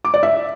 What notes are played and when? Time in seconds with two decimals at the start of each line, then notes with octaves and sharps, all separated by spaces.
0.05 D6
0.14 D5
0.23 E5